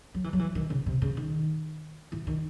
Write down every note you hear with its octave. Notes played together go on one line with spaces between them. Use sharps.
F#3
E3
F#3
E3
D#3
C#3
C3
C#3
D#3
E3
D#3